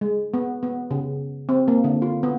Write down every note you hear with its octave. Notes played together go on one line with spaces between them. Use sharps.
G#3
B3
B3
C#3
C4
A#3
D3
F4
B3